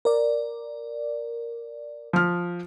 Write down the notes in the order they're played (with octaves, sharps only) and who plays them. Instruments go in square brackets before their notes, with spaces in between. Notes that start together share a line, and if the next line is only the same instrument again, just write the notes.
[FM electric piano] A#4 D5
[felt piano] F3 F6